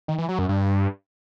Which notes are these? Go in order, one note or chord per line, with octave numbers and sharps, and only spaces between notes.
D#3
E3
F#3
F#2
G2